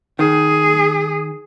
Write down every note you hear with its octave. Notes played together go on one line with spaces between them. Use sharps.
D#3 G#4